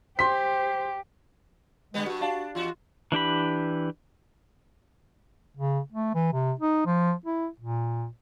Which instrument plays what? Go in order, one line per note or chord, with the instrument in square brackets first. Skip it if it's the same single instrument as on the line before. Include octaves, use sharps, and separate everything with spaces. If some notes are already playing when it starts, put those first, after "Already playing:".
[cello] G4 [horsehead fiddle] C5 [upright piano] C6 B6
[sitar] D3 G3 B3 [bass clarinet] G#3 [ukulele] B4
[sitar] G2 [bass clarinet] F#4
[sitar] D4 [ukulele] D5 F5 A5
[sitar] E2 F#4 [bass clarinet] F4
[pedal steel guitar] E3 D4 G4 B5
[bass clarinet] C#3
A3
E3
C3
D#4
F3
E4
A#2